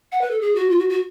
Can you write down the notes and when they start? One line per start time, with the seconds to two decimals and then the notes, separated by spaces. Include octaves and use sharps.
0.12 F#5
0.21 B4
0.31 A4
0.41 G#4
0.55 F#4
0.70 F4
0.79 F#4
0.89 F#4